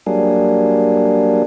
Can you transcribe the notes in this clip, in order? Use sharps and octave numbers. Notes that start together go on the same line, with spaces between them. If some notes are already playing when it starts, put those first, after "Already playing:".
F#3 G3 A#3 D4 G#4